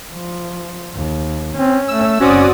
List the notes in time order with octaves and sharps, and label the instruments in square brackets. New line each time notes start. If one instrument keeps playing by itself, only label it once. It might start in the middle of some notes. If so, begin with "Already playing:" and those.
[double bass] F3
D#2
[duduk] C4 [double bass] C#4
[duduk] A3 [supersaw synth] E6
[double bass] F#1 C4 [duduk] C#4 [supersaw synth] F#4 D5 D#6